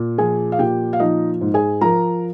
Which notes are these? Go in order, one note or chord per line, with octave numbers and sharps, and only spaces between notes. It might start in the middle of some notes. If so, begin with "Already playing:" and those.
Already playing: A#2
F3 G#4 G#5
F5
A#2 G4 G5
F5
F3 D#4 D#5
G#2
G#4 G#5
F3 A#4 A#5